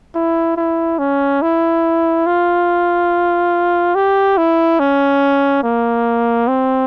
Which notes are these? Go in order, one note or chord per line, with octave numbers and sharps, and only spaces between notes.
E4
E4
C#4
E4
F4
G4
E4
C#4
A#3
C4